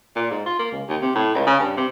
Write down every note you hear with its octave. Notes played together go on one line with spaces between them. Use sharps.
A#2
G#2
F4
A#3
C#2
D#2
C3
A2
C#2
C#3
G2
C3